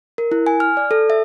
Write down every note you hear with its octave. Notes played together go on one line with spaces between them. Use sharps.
A#4
E4
G#5
F6
D5
A4
E5